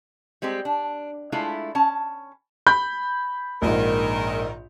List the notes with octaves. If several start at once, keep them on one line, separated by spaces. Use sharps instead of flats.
G3 G#3 C4 G4 C5
D4
G#3 A3 D4 E4 F4
C#4 A5
B5 G6
A#1 G#2 D#3 A#4